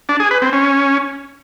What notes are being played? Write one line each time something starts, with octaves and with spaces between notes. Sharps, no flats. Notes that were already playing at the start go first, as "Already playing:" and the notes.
D4
G#4
B4
C4
C#4